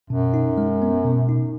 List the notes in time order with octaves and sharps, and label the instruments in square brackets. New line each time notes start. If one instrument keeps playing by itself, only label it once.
[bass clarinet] F#2 [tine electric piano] B2
[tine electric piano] D#4
G#3
B3
B2
D#4